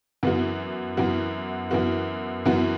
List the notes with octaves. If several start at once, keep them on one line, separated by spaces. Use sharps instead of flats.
F#2 E3 B3 F#4
F#2 E3 B3 F#4
F#2 E3 B3 F#4
F#2 E3 B3 F#4